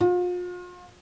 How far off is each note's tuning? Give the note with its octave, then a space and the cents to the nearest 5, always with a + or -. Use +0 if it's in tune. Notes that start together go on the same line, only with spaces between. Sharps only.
F4 +40